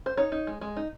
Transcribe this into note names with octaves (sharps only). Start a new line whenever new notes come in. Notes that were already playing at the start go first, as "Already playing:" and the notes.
C5
D#4 C#5
D#4
G#3
G#3
D#4